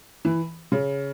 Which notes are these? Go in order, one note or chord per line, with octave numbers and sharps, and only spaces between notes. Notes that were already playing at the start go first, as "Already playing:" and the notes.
E3
C#3